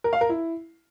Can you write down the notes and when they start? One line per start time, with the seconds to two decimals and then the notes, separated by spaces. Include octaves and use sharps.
0.04 A#4
0.13 F5
0.21 A#4
0.29 E4